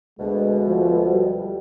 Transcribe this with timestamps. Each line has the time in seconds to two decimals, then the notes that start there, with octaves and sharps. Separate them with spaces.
0.19 D2 B2 G#3
0.67 F3
1.11 G3